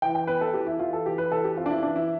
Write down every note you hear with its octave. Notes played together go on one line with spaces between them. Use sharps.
E3 G5
G5
B3 B4
A4
E3 G4
E4
E3 F4
A4
E3 G4
B4
E3 A4
G4
C4 F4
D4
E4
E3 D4
E4